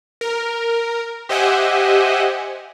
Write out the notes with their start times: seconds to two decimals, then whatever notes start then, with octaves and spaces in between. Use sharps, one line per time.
0.21 A#4
1.29 G4 C5 D#5 E5 F#5 G#5